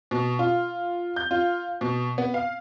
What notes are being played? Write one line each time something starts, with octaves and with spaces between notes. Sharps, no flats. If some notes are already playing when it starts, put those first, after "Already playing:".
B2
F4
G6
F4
B2
B3
F5